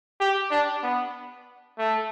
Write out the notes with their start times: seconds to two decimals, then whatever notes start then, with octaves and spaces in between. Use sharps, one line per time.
0.20 G4
0.51 D4
0.83 B3
1.78 A3